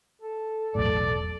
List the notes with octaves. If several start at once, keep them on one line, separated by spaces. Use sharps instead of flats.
A4
E1 B1 A2 D5